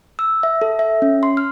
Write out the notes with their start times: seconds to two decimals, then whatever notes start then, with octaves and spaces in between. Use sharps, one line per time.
0.19 E6
0.43 E5
0.62 A4
0.79 E5
1.02 C#4
1.23 C6
1.37 F6